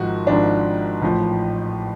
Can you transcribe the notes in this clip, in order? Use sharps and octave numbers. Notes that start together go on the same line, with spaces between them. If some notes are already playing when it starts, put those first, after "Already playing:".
Already playing: G#1 G#2 F3 F#4
G#1 G#2 F3 D4
A1 A2 F3